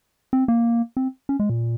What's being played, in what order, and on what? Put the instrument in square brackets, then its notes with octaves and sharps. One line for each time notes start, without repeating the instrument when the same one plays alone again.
[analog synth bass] C4
A#3
C4
C#4
G#3
A#2